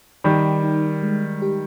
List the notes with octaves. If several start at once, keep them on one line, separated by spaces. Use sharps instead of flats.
D#3 G3 D#4
D#4
G#3
G4